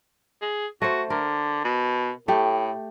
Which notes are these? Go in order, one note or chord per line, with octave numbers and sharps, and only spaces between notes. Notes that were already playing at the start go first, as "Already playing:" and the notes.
G#4
A3 F#4 C5
D3 A#4
B2
A2 A3 G4